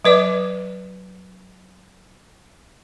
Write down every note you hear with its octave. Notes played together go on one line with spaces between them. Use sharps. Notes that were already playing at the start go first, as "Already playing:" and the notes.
F#3 B4 D5 D6